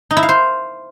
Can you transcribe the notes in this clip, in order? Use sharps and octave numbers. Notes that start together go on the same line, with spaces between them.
D#4
E4
F5
C5